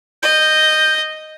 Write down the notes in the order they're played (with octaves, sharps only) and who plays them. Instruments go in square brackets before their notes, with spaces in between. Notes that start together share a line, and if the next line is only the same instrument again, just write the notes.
[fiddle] D#5 [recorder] G6